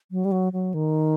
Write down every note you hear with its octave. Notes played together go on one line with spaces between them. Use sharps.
F#3
G3
F#3
F#3
D#3